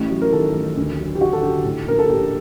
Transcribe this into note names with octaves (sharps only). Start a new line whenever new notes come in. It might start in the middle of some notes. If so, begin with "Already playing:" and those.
Already playing: A1 A2
F#3
A#4
D#3 A4
A1
D2
F#3
G4
D3 F#4
A4
D3 G4
A2
A#1 A#4
A4
A#1 G4